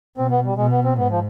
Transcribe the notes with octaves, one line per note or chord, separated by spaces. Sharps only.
B2 C4
B3
G3
B2 G#3
B3
C4
G#2 B3
F3